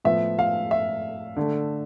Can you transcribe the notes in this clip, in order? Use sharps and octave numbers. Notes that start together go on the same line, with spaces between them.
A2 F3 B3 E5
F5
E5
D3 A3